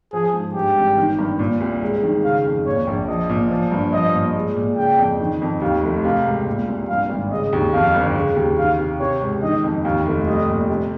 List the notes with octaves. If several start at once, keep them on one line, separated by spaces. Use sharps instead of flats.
F3 G#4
G#2
G2 G4
G#1
D#3
G2
A#2
C2
G#3
D#3
C#3 F5
F2
A#2 C#5
A#1
F3 D#5
A#2
F3
G2
F3 D#5
A#2
G#3
A#2
C#3 G5
F2
D#3
F2
D#2 F5
F1
C3 F5
C#2
A#2
C2
G2 F5
G#1
C#3 D#5
D#2
F2 F5
G1
C#3
D#2
D#3 F5
C3
C3 C#5
C#2
D#3 D#5
F2
D#2 F5
F1
G3 D#5
A#2
C3